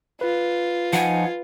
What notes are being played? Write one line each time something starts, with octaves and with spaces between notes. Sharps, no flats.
F4 B4
F3 D#4 F#5 G#5